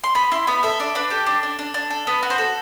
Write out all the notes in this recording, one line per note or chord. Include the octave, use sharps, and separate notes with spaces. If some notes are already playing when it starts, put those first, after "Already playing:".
C6
B3 B5
E4 C6
B3 B5
A4 E5
D4 D5
D4 B4
G4 A4
D4
D4
D4
D4
A4
B3 B4
F#4
C5
A4